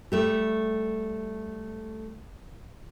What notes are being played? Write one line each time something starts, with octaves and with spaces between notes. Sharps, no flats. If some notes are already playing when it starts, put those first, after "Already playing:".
G3 A3 G4